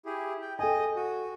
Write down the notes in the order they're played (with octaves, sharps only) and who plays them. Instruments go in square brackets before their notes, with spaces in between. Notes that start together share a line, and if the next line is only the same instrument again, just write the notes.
[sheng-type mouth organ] E4 G4 G#4
G5
[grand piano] A4 G5 G#5 [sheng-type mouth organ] D#5
[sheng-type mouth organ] F#4